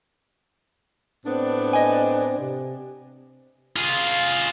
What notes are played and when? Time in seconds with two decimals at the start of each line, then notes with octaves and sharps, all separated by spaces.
1.26 A2 B3 C4 D4
1.73 D#5 G#5
2.39 C3
3.76 F4 G#4